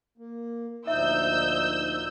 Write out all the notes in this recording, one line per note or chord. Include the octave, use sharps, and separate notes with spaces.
A#3
D2 A#2 F3 D#4 E5 E6 G6